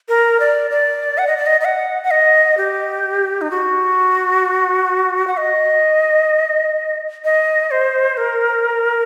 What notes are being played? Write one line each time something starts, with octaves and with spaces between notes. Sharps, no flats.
A#4
D5
D5
F#5
D#5
D5
D#5
D#5
F#5
F#5
D#5
G4
D#4
F#4
F#5
D#5
D#5
C5
A#4